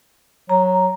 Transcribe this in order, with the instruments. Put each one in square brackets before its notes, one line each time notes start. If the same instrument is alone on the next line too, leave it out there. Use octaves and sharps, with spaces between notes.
[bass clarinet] F#3 [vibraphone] A#5